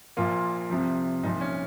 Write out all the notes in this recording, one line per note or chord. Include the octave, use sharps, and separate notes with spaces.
A#1 A#2 F3 A#3 F4
C2 C3 F3
C2 A#2 F3 D#4
C#4